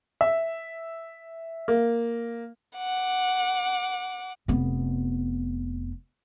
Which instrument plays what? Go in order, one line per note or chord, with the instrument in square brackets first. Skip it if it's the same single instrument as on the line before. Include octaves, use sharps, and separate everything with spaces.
[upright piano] E5
A#3
[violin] F#5 D6
[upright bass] F1 B3